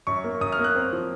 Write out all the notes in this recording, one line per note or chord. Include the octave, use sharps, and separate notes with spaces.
F#2 C#6
A#3
F#2 D#6
F6
A#3
F#6
C4
F3